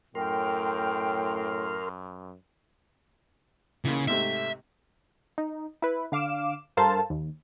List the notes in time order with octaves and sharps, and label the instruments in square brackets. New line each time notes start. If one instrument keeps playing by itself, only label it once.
[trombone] F#2 [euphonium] A2 [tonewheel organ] A#4 C6 F6 [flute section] G5
[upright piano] D#2 E3 [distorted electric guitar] C#3
[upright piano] G#2 C3 A3 [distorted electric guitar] E5
[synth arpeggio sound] D#4
E4 B4
D3 F5 D6 E7
G2 A4 A#4 C5 F5 A5
D#2